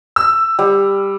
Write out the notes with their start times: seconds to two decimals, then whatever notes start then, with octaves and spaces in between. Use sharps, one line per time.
0.16 E6
0.59 G3